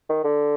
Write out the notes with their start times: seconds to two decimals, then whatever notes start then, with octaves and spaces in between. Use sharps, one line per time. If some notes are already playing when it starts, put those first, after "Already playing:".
0.09 D#3
0.24 D3